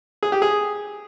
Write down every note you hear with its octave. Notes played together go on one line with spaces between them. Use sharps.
G#4
G4
G#4